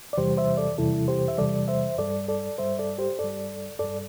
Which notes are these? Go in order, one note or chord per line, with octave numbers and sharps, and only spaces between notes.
D5
E2 C3 E3 G3 G4 C5
C5 E5
A4 D5
E2 C3 E3 G3 E4 A4
G4 C5
E5
E2 C3 E3 G3 A4 D5
C5 E5
G2 G3 A4 D5
A4 D5
G2 G3 C5 E5
A4 D5
G4 C5
G2 G3 A4 D5
G2 G3 A4 D5